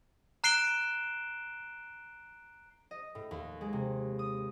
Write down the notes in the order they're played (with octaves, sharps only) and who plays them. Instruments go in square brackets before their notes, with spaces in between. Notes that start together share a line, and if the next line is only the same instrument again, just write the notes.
[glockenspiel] A#5 F#6 C7 D7 E7 G7
[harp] D#5
A2
D#2
G#3
C3
D#6